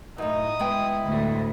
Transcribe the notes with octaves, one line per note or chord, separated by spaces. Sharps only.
F#2 A2 D#4 D#6
G#3 B3 E4 G5
D2 A2